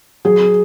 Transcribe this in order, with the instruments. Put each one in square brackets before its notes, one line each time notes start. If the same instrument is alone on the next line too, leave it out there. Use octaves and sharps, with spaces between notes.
[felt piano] F#3 G#4